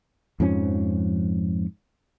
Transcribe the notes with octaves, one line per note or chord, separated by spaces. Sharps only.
F2 G#2 F3 C#4